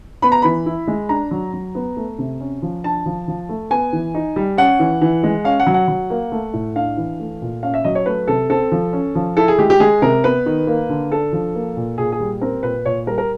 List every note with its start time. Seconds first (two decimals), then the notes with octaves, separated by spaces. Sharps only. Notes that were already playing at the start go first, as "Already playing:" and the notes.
0.22 B3 B5
0.32 A#5
0.42 E3 B5
0.66 E4
0.87 G#3
1.09 D4 A#5
1.31 F#3
1.53 F#3
1.75 B3
1.97 A3
2.18 C3
2.40 C#4
2.62 F3
2.84 D4 A5
3.06 F3
3.28 F3
3.49 A3
3.71 B3 G#5
3.93 E3
4.14 D#4
4.36 G3
4.58 C#4 F#5
4.79 E3
5.01 E3
5.23 G#3
5.44 C#4 F5
5.60 F#5
5.67 F#3
5.74 F#5
5.88 F#3
6.10 A#3
6.32 A3
6.53 A2
6.75 D4 F5
6.97 E3
7.20 A3
7.42 A#2
7.63 C#4 F5
7.74 E5
7.84 F#3 D#5
7.95 C#5
8.06 A3 B4
8.28 C3 A4
8.50 C4 A4
8.72 F3
8.93 C#4
9.15 F3
9.37 E4 A4
9.48 G#4
9.59 G#3 G4
9.70 G4
9.80 G#3 G#4
10.02 C3 A#4
10.24 B3 B4
10.46 D#3
10.67 A#3
10.89 D3
11.11 D4 A4
11.32 F3
11.55 A#3
11.76 A#2
11.98 A#2 G#4
12.12 G#4
12.20 G3
12.41 C4 A#4
12.63 A#2 B4
12.85 A#2 C#5
13.07 G3 A#4
13.18 A#4